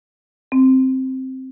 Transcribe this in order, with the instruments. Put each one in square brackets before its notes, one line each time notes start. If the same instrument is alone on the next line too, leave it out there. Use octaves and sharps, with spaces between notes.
[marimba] C4